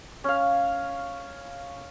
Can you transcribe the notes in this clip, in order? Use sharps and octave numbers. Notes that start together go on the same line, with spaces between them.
C#4 F5